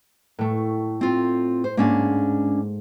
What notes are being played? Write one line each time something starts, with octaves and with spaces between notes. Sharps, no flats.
A2 A3
C4 F4
C5
G#2 A#3 C#4 D4